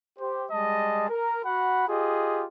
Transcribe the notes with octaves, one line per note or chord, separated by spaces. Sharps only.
G4 C5
G3 G#3 D#5 A5
A#4
F#4 F#5 B5
F4 G4 G#4 D#5